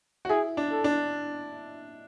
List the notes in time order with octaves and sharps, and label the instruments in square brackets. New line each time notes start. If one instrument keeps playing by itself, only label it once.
[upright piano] F#4
[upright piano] E4 [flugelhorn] G#4
[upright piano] D4
[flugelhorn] A4
[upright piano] D4